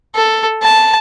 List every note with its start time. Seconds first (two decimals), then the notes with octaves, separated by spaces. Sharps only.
0.15 A4
0.63 A5